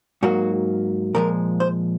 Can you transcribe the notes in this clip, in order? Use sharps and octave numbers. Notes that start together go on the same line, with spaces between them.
G#2 F#3 A#3 F#4
A#2 F3 G#3 A#4
C5